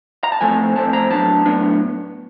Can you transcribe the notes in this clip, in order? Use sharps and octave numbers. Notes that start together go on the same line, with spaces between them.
A#5
A5
A2 F3 A3 C4 G#5
A2 F3 A3 C4 A5
A#5
A2 F#3 B3 D4 A5
A2 F#3 B3 D4